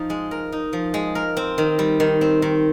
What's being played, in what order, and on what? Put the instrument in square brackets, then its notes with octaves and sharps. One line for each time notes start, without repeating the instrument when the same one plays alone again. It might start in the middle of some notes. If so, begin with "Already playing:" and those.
Already playing: [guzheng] F3 D#4
G#3
A#4
D#4
F3
G#3
A#4
C4
D#3
G3
D#3
C4
D#3